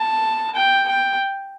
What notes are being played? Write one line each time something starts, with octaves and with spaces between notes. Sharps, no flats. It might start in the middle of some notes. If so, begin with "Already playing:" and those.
Already playing: A5
G5
G5